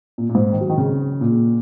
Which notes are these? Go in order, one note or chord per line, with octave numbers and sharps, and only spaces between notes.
A#2
A#2
G#2
D#3
F#3
D#3
C#3
A#2